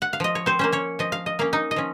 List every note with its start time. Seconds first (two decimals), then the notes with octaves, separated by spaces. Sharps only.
0.02 F#5
0.13 F5
0.20 F3 D#5
0.35 C#5
0.46 C4 C5
0.59 A#3 C#4 C5
0.72 C#4 C#5
0.99 F3 D#5
1.12 F5
1.26 D#5
1.39 A#3 C#4 F5
1.53 D#4 D#5
1.71 D#5
1.76 F3 C#4